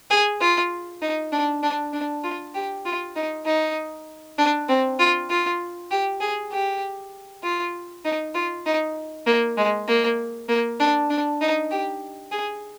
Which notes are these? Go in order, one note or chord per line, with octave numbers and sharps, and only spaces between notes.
G#4
F4
D#4
D4
D4
D4
F4
G4
F4
D#4
D#4
D4
C4
F4
F4
G4
G#4
G4
F4
D#4
F4
D#4
A#3
G#3
A#3
A#3
D4
D4
D#4
G4
G#4